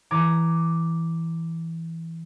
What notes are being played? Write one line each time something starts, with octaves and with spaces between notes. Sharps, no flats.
E3 A#5 D6 G#6